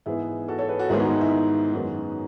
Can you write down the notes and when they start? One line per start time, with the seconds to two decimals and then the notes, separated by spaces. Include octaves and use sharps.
0.06 G#2 E3 B3 E4 G#4
0.48 F#4 A4
0.58 A4 C#5
0.69 G#4 B4
0.79 F#4 A4
0.90 G#2 D#3 G#3 B3 E4 G#4
1.00 D#4 F#4
1.10 D#4
1.21 E4
1.32 E4
1.73 F#2 D#3 G#3 B3 D#4 F#4